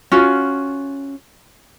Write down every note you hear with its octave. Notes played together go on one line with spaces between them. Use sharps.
C#4 F4 F#4